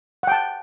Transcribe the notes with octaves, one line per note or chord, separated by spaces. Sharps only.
F#5 G5 A5